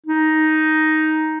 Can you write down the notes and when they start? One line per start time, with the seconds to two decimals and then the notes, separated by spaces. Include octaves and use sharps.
0.06 D#4